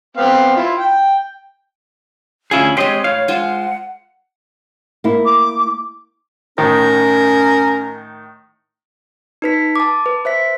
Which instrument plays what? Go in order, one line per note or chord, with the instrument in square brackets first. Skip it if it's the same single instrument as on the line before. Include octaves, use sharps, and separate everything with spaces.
[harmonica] B3 C4 F5
E4 F4
G5
[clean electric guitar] D2 E4 G#4 [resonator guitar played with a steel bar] C#4 F4
[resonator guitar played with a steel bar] G#3 C4 [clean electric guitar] G4 C5 D#5 [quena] C#5
[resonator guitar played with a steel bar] A2 [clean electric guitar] F5
[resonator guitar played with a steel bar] G#3 F4 C5 [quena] F#5
[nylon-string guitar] A#3 E4
[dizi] D6
[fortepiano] A2 D#3 [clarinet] C#4 [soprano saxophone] A#4
[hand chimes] D#4 B4 B6
A5 D6
B4
C5 E5 B6